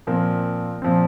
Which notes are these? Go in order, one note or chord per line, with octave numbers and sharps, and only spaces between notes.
A#2 F3 C4 A#4
A#2 F3 C4